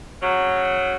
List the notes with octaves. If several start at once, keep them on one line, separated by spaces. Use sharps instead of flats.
C#3 F#3